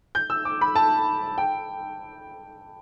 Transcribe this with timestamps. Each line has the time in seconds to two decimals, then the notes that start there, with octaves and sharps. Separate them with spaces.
0.15 G6
0.30 E6
0.45 D6
0.61 B5
0.76 A5
1.38 G5